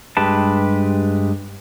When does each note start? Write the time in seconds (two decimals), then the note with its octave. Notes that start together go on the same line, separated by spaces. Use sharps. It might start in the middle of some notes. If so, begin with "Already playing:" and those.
0.17 G2 G#3 G4 B4 A5